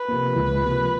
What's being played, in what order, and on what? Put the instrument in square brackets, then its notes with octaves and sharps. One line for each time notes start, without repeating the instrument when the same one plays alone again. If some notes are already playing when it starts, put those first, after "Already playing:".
Already playing: [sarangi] B4
[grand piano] C3 F3 A#3
C#2
C3 F3 A#3